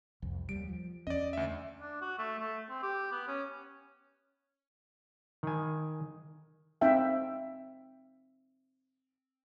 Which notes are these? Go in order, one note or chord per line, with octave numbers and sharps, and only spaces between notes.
C2 F2
D#2 G3 D7
F3
E2 C#4 D5 D#5
D2 E5
D4
F#4
A3
A3
C4
G4
B3
C#4
D#3 G#5
C4 D#4 E5 F5 G5